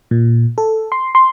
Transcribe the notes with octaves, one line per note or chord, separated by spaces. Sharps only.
A#2
A4
C6
C6